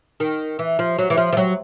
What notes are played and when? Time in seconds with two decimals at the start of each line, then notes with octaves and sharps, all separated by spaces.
0.20 D#3
0.59 E3
0.79 F3
0.99 F#3
1.10 E3
1.17 F3
1.33 F3
1.37 F#3